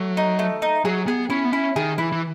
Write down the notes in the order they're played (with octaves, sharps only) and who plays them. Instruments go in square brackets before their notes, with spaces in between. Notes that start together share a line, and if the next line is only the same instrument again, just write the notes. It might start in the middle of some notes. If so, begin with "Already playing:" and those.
Already playing: [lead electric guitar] F#3 [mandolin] A3
[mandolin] D#4
A3
D#4
[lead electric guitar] F#3 [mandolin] G#4
[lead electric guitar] B3 [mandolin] G#4
[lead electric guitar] C#4 [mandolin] E4
[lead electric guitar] B3
[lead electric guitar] C#4 [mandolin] E4
[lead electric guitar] D#3 [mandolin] G#4
[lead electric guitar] E3 [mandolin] E4
[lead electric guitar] E3